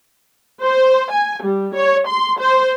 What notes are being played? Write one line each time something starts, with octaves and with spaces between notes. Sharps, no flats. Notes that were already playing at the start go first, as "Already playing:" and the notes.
C5
G#5
G3
C#5
C6
C5